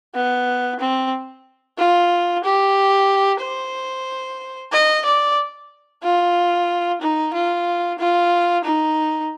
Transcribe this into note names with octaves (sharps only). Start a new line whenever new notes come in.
B3
C4
F4
G4
C5
D#5
D5
F4
D#4
F4
F4
D#4